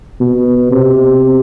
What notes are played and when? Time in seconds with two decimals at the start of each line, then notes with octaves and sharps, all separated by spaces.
0.21 B2
0.71 C3